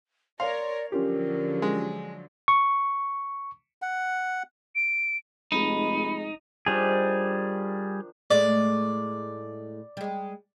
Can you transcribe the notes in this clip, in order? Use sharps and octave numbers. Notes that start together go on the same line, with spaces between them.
A#4 C#5 D5 F5 C6
D3 F3 F#3 C#4 F4 G4 A#4
G#3
C#6
F#5
D7
F1 G#3 D#4 B5
D#3 F3 G3 D4 G#4
A2 G#3 A3 D5
G3 G#3